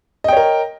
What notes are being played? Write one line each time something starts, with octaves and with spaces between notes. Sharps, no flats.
A#4 C#5 D#5 G5